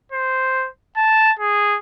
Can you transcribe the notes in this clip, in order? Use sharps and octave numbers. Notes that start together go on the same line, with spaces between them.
C5
A5
G#4